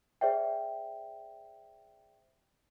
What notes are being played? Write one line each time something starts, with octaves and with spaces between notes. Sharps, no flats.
G#4 C5 D5 E5 G5